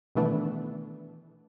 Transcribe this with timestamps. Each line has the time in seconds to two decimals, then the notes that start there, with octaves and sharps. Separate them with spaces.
0.15 B2 D#3 E3 A3 B3 D4